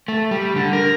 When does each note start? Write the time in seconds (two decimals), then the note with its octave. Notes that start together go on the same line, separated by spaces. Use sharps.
0.08 A3
0.31 G3
0.56 D3
0.73 A#4